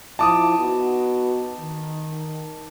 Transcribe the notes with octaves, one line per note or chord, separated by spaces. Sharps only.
F3 E4 A5 D6 D#6
B3 D#4 F#4
D#3